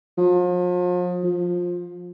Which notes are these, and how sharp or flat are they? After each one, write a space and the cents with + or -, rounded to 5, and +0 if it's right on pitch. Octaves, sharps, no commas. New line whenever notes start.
F3 +40
F3 +15